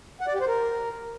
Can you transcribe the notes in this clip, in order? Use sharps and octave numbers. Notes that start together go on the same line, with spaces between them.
F#5
D5
G4
C5
A#4